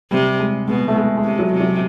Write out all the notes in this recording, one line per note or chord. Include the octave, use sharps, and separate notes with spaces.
C3 G3
G#3
B2 G#3
A3
G#3
G#3
C3
F#3
C3
F#3